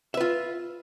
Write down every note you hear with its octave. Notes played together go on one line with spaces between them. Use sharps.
F4 B4 E5